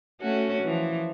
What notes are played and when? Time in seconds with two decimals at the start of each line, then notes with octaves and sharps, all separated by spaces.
0.21 A3 C#4 F#4
0.63 E3 F3